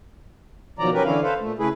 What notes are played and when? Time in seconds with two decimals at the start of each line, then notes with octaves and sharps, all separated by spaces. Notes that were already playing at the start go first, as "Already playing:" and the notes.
0.79 B2 D#3 F3 F#3 D5 A#5
0.93 F#3 C#4 G4 A#4 B4
1.05 D3 E3 C#4 D4 E4 F5
1.22 A4 B4 C5 F5
1.40 A#2 A3
1.59 C#3 A3 E4 G#4 B4